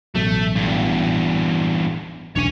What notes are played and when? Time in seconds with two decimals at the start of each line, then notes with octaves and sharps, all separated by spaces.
0.15 A1 B2 F#3 A3
0.55 E2 G2
2.36 E1 B1 D4 C#5 G#5